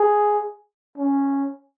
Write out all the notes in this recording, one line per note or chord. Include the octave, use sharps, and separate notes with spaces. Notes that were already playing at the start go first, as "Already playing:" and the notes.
Already playing: G#4
C#4